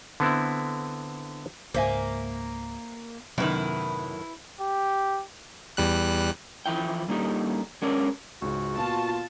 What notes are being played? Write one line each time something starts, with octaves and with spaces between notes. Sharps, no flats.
D3 B3 C4 E4
C#2 G#2 A#3 C5 E5 G#5
F#2 A2 C3 D#3 F#3 B3 E4 B4
G4
E2 G3 F#6
E3 F3 E4 G5
G3 A#3 D4 D#4 G4 A4
G#3 B3 C#4 D4 A#4 D5
C#2 G#2 C#3 F#4
A#2 B3 F4 A5